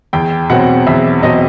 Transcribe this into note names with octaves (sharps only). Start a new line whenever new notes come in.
E2 G5
B2 F#3 C4 F#5
E2 E5
B2 F#3 C4 D#5